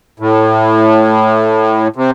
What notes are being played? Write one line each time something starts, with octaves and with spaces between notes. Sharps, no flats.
A2
C3